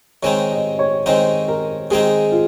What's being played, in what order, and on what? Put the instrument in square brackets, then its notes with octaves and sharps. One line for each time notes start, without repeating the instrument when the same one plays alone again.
[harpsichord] D#3 G#3 C4 D#4 [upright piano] C#5
[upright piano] D#5
C#5
[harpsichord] D#3 G#3 C4 D#4 [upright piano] C5
[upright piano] A#4
[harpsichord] D#3 G#3 C4 D#4 [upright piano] G#4
[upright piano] F4